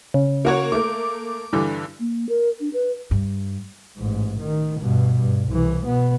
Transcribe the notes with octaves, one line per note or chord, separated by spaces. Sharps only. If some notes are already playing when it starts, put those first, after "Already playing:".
C#3
A#3 F#4 C#5
A3 A#3 D6
G2 D3 E3
A#3
A#4
D4
B4
G2
A1 G#2
D#3
G2 B2
G2
C2 E3
B2 B3